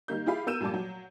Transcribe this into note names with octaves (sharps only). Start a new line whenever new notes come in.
D#3 G3 A#3 G6
E4 F4 G4 G#4 F5 B5
B3 A#4 E6 G6 D#7 E7
F1 G2 A#2 A5 D6
F#3